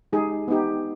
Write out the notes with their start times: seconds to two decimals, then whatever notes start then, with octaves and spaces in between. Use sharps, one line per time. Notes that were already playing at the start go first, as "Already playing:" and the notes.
0.13 G#3 D#4 G4 G#4
0.48 B3 D#4 G4